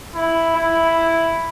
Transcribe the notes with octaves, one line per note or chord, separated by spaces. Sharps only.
E4
E4